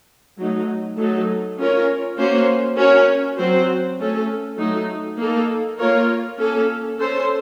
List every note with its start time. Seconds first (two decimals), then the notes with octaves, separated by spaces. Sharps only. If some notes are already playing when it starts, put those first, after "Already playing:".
0.38 F#3 A3 D#4
0.98 F#3 A3 D#4 A4
1.58 C#4 F4 A#4 C#5
2.18 A#3 C#4 F#4 C5
2.77 C#4 F#4 A#4 C#5
3.38 F#3 C4 F#4 C5
3.98 A3 C#4 A4
4.58 F#3 A3 D#4
5.18 A#3 D#4 A4
5.78 A#3 F4 A#4 C#5
6.38 A#3 C#4 A4
6.98 C#4 A4 C5